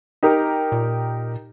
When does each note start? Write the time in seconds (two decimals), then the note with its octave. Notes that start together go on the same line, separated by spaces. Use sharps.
0.23 D#4 G4 A#4
0.72 A#2